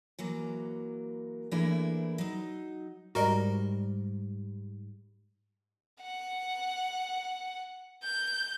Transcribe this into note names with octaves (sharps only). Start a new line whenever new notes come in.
E3 F#3 A#3
E3 A3 A#3 D4 E4 G#4
F#3 D#4
G#2 G3 F#4 A#4 D5 D#5 A#5
F#5
G6